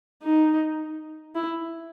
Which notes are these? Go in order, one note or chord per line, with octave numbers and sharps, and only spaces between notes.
D#4
E4